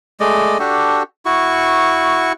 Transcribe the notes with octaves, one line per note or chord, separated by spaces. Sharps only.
G#3 A3 D5 D#5
D4 F#4 G4 A4
E4 F#4 C#6